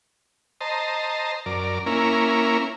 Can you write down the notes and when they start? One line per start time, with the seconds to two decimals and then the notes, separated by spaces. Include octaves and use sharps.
0.61 C5 D#5 A5 A#5
1.46 F#2 A#4 D5
1.86 A#3 C#4 E4 A#4